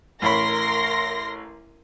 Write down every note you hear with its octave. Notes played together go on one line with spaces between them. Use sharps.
A1 A#4 C#5 B5 C6 A#6